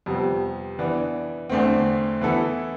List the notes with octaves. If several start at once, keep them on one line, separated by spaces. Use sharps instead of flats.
F2 C3 G3 B3
E3 B3 D4
E2 D3 A3 C4
E3 B3 E4 A4